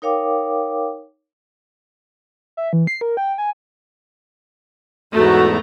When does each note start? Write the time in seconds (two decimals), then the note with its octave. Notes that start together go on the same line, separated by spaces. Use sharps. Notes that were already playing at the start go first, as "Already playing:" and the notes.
0.02 D#4 A#4 C#5 F5 G5 D6
2.57 E5
2.73 E3
2.87 C7
3.01 A#4
3.17 G5
3.38 G#5
5.14 E2 G#2 A3 B3 F#4 A#5